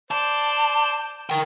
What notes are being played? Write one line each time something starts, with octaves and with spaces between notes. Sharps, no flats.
C5 D5 A5
A#4 G5